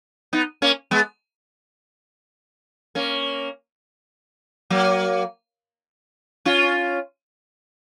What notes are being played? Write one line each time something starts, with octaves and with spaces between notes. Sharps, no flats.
B3 D#4
A#3 C#4
G#3 B3
A#3 C#4
F#3 A#3
C#4 F4